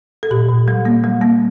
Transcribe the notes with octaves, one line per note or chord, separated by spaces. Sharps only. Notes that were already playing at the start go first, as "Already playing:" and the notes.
A4
A#2 G4
A#2
G3
A#3
G3
A#3